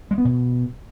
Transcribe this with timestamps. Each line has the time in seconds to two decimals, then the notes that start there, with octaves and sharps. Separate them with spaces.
0.11 G#3
0.18 B3
0.25 B2